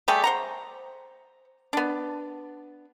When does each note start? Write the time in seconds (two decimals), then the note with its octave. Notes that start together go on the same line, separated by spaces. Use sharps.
0.08 G3 A3 G4 G#4
0.24 C5 F#5 A#5
1.73 B3 D4